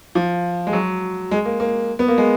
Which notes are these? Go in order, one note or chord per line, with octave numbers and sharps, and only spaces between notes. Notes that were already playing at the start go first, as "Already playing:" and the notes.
F3
G#3
F#3
G#3
A#3
A#3
B3
A#3
G#3